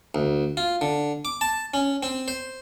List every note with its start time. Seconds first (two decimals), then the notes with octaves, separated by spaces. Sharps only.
0.15 D2
0.57 F4
0.81 D3
1.25 D6
1.41 A5
1.74 C#4
2.03 C4
2.28 C5